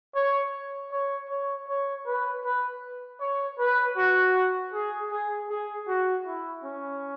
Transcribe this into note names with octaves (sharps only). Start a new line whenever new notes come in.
C#5
C#5
C#5
C#5
B4
B4
C#5
B4
F#4
G#4
G#4
G#4
F#4
E4
C#4